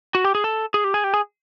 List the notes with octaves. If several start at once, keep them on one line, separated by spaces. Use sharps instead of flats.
F#4
G4
G#4
A4
G#4
G4
G#4
G4
G#4